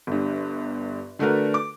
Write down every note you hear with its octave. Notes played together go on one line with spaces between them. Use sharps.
G1 G2
D3 A3 D4 F#4 A#4 B4
D6